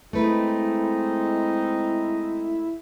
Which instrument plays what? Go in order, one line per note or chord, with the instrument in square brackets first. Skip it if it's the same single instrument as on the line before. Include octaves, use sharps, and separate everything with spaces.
[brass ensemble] G#3 C4 D#4 [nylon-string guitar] A3 B4 [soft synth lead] E4